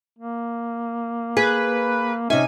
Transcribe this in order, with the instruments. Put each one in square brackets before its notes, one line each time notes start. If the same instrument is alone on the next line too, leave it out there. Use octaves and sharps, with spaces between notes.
[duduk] A#3
[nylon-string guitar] G#4 [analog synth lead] B4
[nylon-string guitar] C3 D#4 E5 [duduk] C#4 [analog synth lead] G#5